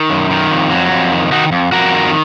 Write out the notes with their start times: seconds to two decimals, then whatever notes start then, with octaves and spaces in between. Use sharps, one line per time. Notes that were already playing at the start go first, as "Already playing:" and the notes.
Already playing: D#3
0.10 F#2
0.31 D#3
0.51 F2
0.71 F#3
0.91 F2
1.11 D#3
1.32 D#3 D#4 F#4
1.52 F2
1.72 F2 F#4 A#4
1.93 D#3